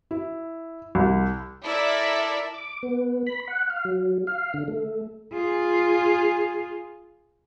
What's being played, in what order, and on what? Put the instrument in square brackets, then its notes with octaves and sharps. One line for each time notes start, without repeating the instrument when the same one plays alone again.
[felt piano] E4
C2
[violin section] E4 A4 A#4 D5 E5
[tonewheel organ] D6
B3
B5
F#5
F5
F#3
F5
D3
A3
[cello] F4 G#4